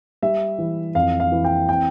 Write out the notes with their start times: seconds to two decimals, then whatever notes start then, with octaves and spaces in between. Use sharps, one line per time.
0.23 G3 E5
0.58 E3
0.95 F2 F5
1.20 F5
1.32 E3
1.44 G5
1.69 C4 G5